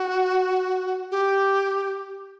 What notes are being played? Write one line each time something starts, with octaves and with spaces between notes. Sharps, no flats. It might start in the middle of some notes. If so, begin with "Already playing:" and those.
Already playing: F#4
G4